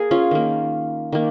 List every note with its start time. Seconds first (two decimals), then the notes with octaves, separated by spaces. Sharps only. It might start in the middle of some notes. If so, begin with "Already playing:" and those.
Already playing: A#3 G#4 A#4
0.11 C#4 F4
0.31 D#3 A#3
1.12 D#3 A#3